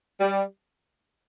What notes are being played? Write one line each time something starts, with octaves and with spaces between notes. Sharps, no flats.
G3